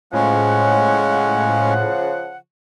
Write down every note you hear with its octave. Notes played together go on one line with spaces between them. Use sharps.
A2 C#3 F3 G#3 C#4 F#5